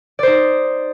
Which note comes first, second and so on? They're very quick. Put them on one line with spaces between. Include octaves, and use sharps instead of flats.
D5 C5 D#4